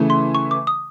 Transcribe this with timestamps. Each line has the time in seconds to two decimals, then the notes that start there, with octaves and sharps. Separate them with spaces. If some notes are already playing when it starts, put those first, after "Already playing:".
Already playing: C#3 E3 A3
0.10 C6
0.35 C#6
0.51 D6
0.67 D#6